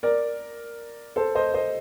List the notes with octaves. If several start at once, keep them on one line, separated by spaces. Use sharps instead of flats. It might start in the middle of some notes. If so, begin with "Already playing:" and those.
A#4 D5
A4 C5
C5 D#5
C5 D#5